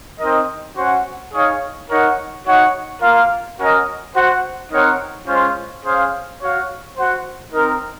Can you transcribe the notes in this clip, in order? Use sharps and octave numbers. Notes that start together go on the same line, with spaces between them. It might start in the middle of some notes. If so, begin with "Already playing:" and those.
C4 D#4 A#4 D#5
C#4 F#4 C5 F#5
D#4 G#4 C#5 F5
D#4 A#4 C#5 F#5
D#4 F#4 C#5 F#5
A#3 F4 A#4 F5
C#4 F#4 A#4 D#5
F#4 C5 F#5
C4 D#4 A#4 C#5 F#5
G#3 C#4 F4 C5
C#4 G#4 C5 F5
F#4 C#5 F5
F#4 C5 F#5
C4 D#4 A#4